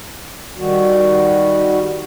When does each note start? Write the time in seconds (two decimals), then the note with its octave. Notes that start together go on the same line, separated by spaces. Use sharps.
0.58 D#3 G3 F#4